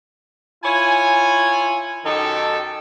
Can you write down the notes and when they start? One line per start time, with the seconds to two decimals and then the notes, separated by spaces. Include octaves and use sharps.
0.64 E4 F4 C#5 G#5
2.05 F#2 D#3 D#4 G4 A4